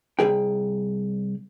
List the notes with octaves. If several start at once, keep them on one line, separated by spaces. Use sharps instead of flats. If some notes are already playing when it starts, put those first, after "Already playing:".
C2 F#3 G#4 G5